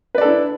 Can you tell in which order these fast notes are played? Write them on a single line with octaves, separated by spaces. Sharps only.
B4 D5 A4 D4 E4